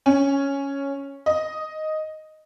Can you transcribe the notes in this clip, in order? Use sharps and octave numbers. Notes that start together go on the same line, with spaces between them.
C#4
D#5